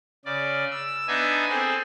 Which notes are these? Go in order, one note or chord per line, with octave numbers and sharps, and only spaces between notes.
C#3 D5
E6
B3 D4 D#4 E5 G#5
C4 G#4 A4 C5